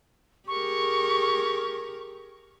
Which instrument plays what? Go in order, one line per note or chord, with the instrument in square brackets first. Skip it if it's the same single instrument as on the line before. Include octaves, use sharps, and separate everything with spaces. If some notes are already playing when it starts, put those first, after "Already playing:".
[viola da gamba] G4 G#4 A#4 [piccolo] C#6